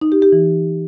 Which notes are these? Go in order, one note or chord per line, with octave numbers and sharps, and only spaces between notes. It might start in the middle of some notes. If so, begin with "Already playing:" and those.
D#4
G4
G4
E3